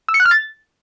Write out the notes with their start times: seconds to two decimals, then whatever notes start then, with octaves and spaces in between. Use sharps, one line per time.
0.09 E6
0.14 C#7
0.20 F#6
0.25 F6
0.31 A6